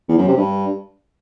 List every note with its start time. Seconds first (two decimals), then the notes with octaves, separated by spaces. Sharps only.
0.08 E2
0.18 F#2
0.28 C3
0.37 G2